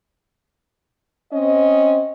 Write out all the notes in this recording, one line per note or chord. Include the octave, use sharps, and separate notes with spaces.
C4 C#4 D#5